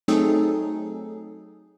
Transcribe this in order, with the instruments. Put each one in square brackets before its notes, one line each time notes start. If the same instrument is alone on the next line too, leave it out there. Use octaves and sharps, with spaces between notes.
[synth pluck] F#3 A3 C4 D#4 G#4 A4